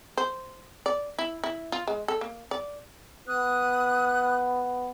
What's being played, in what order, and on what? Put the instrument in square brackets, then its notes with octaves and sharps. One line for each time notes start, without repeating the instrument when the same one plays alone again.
[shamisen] C5
D5
E4
E4
F4
G#3
A4
A#3
D5
[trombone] B3 [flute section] D#6 F#6